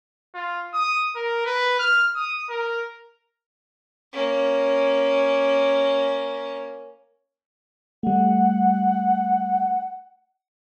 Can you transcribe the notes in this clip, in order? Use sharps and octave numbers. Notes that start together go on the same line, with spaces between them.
F4
D#6
A#4
B4
F6
D#6
A#4
A#3 C#4
G3 A3 F#5